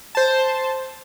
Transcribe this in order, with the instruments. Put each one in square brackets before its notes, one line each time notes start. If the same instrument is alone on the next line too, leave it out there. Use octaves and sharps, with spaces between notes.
[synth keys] C5 A5